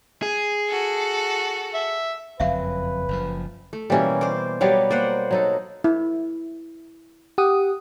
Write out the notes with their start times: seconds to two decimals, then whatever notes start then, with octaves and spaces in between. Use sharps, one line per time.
0.22 G#4
0.69 F#4 A4
1.74 E5
2.40 F#1 F2 F#3 B4 E5 F5
3.08 F#1 F#2 F3
3.73 A3
3.90 B2 E3 G3 A#3 C#4
4.21 C5 D5
4.61 F#3 G3 B3 C#5 D5 F5
4.90 A#3 C5 D5 F#5
5.31 F#3 D#4 A4
5.84 E4
7.38 G4 F#5 D#6